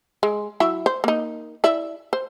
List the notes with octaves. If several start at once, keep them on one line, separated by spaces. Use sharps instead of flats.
G#3
F#3 E4 E5
C5
A#3 D#4
E4 D5 E5
C5